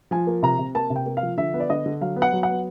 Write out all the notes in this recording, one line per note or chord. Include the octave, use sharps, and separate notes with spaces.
F3 G#5
A#3
C3 A#5
C3
A#3 A5
C3
G5
A#3
F5
F3
D3 E5
B3
D5
D3 D#5
D3
F#3 F5
B3
F#5
F#3
F#5
B3